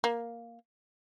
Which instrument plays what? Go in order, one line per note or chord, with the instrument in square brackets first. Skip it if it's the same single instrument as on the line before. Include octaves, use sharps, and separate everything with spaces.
[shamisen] A#3